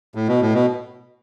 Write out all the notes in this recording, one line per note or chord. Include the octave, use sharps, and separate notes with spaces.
A2
B2
A2
B2